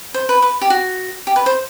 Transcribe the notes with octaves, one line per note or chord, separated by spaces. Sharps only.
C5
B4
B4
G4
F#4
G4
B4
C5